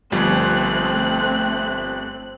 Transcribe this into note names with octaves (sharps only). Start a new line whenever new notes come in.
G1 F3 G3 A3 C4 F#6